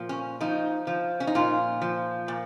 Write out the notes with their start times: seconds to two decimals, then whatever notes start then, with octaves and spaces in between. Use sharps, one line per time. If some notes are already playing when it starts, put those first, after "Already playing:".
Already playing: A#2 F3
0.09 C#4
0.41 F3 D#4
0.87 F3
1.20 C#4
1.27 D#4
1.35 A#2 F4
1.81 F3
2.28 A#2